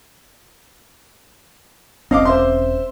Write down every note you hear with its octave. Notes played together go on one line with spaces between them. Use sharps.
E1 C4 C#4 D#5 F5 D6
C5 E5 C6